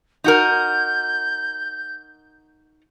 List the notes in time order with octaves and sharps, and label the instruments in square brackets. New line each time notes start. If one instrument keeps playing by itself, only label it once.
[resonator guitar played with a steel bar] D#4 F#4 A#4 [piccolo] G6